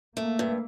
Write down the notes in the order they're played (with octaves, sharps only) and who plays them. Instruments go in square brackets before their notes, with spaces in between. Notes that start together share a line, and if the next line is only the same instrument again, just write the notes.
[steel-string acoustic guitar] A3 [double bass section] A#3
[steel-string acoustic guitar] G2